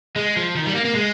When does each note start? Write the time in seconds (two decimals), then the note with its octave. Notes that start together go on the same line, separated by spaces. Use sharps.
0.16 G#3
0.36 F3
0.56 D#3
0.66 G3
0.74 A#3
0.85 A#3
0.95 G#3